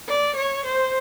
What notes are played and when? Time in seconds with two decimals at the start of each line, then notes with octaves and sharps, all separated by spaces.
0.08 D5
0.36 C#5
0.66 C5